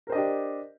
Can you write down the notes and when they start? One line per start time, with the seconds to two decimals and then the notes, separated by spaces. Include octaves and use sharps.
0.07 A#4
0.10 C5
0.12 D#5
0.15 D4
0.18 G4